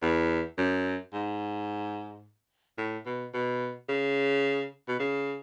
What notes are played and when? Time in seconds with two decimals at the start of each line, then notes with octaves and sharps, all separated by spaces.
0.02 E2
0.58 F#2
1.13 G#2
2.78 A2
3.06 B2
3.34 B2
3.89 C#3
4.88 B2
4.99 C#3